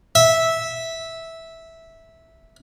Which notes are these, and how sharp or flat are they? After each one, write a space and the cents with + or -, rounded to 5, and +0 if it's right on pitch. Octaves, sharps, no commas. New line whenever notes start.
E5 -10